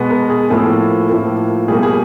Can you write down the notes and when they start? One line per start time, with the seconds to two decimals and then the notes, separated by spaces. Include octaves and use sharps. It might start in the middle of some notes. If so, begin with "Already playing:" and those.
Already playing: B2 G#3 B3
0.11 A#4
0.30 G#4
0.50 A2 F3 A#3 A4
1.09 A2 F3 A#3
1.68 B2 G3 A#3 G#4
1.83 G#4